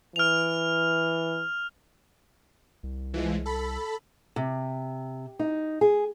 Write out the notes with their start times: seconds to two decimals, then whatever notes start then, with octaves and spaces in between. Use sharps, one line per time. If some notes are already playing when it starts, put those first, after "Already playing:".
0.16 E3 F6 F7
2.83 C2
3.14 E3 F3 G#3
3.46 A4 B5
4.36 C3
5.39 D#4
5.81 G#4